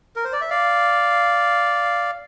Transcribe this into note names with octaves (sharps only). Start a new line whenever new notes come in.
A#4
C5
D5
E5
D5 F5